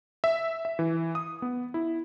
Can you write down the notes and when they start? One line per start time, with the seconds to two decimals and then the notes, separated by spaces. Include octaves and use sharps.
0.24 E5
0.65 E5
0.79 E3
1.15 D#6
1.42 B3
1.74 E4